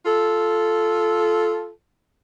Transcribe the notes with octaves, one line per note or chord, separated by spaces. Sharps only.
F4 A4